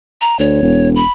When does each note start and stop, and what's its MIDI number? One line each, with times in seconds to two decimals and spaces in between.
0.21 0.39 82
0.39 0.60 38
0.39 0.89 73
0.62 1.01 28
0.96 1.12 83